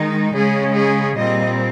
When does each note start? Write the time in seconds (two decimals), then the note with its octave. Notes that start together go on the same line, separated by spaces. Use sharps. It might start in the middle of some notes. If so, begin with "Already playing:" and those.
Already playing: D#3 G#3 D#4
0.33 C#3 G#3 C#4 G#4
0.75 G#4
1.17 A#2 G3 C4 D#5